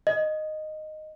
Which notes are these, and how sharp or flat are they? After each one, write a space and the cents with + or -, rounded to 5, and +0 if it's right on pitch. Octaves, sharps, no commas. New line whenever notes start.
D#5 -10